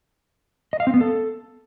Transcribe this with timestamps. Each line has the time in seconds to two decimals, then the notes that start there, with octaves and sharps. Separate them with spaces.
0.73 D#5
0.80 F5
0.87 C4
0.94 B3
1.01 A4